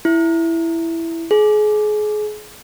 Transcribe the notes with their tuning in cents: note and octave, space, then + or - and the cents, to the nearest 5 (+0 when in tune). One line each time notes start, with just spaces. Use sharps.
E4 +5
G#4 +30